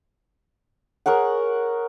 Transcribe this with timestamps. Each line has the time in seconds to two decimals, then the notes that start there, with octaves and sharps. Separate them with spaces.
1.06 G#4 A#4 C#5 F#5